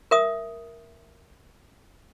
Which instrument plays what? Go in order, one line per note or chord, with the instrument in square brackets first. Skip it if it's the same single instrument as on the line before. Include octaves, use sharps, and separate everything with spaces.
[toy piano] A#4 E5 D#6